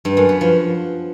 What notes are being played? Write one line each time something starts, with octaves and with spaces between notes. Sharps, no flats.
G2
F#2
B3
F3